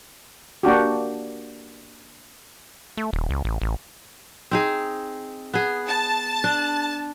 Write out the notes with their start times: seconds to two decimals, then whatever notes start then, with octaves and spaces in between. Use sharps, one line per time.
0.63 A#3 D4 F#4 G4
2.97 A3
3.13 D#1
3.30 C#2
3.45 A1
3.62 A1
4.51 C4 D#4 G#4
5.54 B3 G#4
5.88 A5
6.44 D4